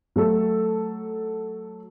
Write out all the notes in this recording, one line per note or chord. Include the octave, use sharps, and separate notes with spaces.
F#3 A3 A4